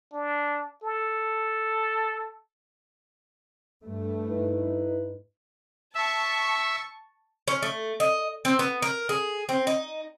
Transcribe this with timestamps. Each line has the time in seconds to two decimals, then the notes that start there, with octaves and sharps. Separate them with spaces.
0.13 D4
0.84 A4
3.84 G2 A3
4.28 D#4 E4 B4
5.95 E5 A5 C#6
7.48 C#4
7.62 A3
8.00 D#5
8.45 C4
8.59 B3
8.82 A#4
9.09 G#4
9.49 C4
9.67 D#4